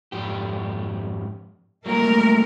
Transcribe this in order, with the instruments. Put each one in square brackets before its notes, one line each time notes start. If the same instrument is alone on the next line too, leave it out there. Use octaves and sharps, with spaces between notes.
[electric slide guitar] F2 G#2 G4
[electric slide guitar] F#3 G3 A#3 [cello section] A3 A#4